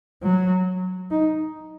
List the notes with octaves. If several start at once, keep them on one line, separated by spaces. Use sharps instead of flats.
F#3
D#4